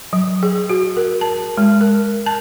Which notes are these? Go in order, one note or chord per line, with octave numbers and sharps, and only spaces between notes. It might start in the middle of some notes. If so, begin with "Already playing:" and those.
F#3
G#4
F#4
A#4
A5
G#3
A#4
A5